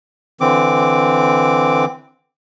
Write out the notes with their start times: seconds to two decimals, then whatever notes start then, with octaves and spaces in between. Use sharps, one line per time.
0.41 D3 E3 C4 D6